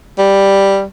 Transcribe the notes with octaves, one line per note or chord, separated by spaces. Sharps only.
G3